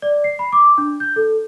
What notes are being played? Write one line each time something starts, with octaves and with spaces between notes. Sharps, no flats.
D5
C7
B5
D6
D4
G6
A4